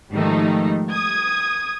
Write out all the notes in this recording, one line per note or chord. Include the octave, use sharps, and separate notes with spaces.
G#2 D#3 F3 G3 A3 D#4
D#6 G#6